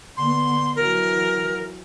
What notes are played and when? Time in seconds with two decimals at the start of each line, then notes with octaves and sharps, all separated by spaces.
0.17 D3 B3 C6
0.76 E3 F#3 A#4